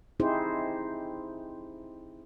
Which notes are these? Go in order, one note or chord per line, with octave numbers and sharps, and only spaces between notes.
C4 D#4 E4 G4 G#4 C5